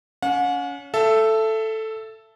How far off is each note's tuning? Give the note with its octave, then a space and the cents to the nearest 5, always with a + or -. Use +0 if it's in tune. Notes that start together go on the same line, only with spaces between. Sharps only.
C#4 +25 F#5 -40
A4 +0 E5 +25